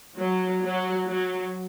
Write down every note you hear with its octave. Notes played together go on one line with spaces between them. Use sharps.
F#3
F#3
F#3